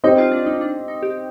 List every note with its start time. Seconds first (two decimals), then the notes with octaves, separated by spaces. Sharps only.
0.04 C4 D#4 G4 C5 D#5
0.18 F4
0.32 D4
0.46 D#4
0.61 D4
0.88 D#4
1.03 G4